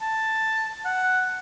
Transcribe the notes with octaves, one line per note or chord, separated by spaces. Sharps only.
A5
F#5